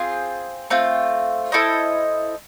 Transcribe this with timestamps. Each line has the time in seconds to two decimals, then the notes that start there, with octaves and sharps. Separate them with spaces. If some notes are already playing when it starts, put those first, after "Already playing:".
Already playing: C4 F4 G#4 C5
0.70 A3 C4 F4
1.52 E4 A4 C5 D#5